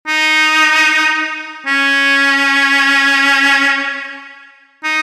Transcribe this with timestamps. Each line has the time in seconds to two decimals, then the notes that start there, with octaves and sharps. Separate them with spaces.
0.08 D#4
1.67 C#4
4.84 D#4